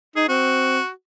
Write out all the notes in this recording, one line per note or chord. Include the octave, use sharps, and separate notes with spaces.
D#4 G#4
C4 F#4